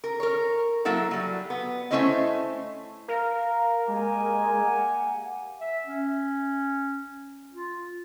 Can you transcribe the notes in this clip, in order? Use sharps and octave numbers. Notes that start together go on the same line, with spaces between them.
A#4
A#4 C#5
F#3 A#3 E4 A4 F#5
F#3 G3
B3
A3 C4 C#4 E4 C5 D#5
A#4 F5
G#3 A#3 G4 G#5
F#5
E5
C#4
F4